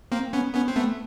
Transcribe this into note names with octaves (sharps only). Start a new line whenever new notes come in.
A#3 C4
B3 C#4
B3 C#4
C4
A3 B3